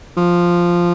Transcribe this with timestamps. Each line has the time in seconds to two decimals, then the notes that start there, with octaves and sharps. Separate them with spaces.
0.17 F3